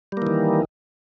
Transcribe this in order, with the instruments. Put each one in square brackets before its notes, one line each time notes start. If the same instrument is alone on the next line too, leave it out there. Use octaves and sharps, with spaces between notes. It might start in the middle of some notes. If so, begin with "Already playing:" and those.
[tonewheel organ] G3
A#3
E3
D#3